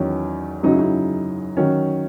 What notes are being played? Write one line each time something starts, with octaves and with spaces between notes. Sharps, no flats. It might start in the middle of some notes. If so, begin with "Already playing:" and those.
Already playing: E2 D#3 F#3 C#4
F#2 C#3 F#3 D#4
E4
D#4
D#3 F#3 C#4